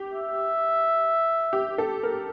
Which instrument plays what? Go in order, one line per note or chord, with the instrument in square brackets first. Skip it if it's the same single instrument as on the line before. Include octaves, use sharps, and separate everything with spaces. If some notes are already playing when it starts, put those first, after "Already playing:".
Already playing: [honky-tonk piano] G4
[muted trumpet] E5
[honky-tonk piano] G4
A4
A#4